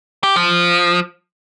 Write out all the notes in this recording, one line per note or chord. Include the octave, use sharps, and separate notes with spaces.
G4
F3